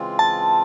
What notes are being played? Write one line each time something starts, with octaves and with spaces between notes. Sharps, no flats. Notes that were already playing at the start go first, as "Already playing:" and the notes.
Already playing: C#3 E3 G#3 C4 F4
A5